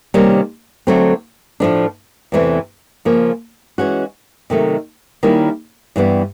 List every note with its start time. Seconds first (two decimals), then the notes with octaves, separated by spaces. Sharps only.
0.14 C3 D#3 G3 A#3 C#4
0.87 D3 F#3 A3 C4
1.60 A2 F3 A3 D4
2.32 E2 C3 E3 A3 C4
3.05 C#3 F3 A#3
3.78 E3 G#3 C#4 F#4
4.50 C3 D#3 F#3 A3
5.23 D#3 G3 A#3 C#4 E4
5.96 G2 E3 G3 B3